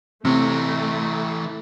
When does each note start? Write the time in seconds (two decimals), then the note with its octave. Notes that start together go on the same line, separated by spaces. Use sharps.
0.25 C3 E3 A3 C#5